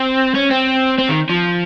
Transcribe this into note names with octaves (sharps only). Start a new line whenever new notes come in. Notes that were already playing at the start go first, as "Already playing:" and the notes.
Already playing: C4
C#4
C4
C4
D#3
F3